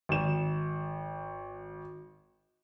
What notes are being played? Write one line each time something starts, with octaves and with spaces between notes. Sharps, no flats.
G#1 E7